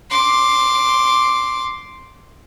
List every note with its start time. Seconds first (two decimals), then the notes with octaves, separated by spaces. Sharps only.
0.10 C6 D6